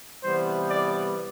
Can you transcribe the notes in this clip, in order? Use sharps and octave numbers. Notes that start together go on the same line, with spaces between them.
C3 E3 G3 B3 C5
D5